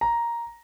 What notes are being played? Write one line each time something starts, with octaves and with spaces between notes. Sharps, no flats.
A#5